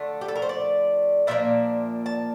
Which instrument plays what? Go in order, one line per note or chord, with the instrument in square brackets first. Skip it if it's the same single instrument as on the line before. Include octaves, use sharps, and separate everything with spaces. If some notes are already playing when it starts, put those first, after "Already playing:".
Already playing: [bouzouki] D3 F3 A3
G4
A4
A#4
C5
D5
A#2 F3 A#3 D4 E5
A5